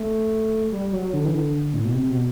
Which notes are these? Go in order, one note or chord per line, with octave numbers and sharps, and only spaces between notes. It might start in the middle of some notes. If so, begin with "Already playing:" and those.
Already playing: A3
G3
F#3
D3
E3
D3
A2
B2
C3
B2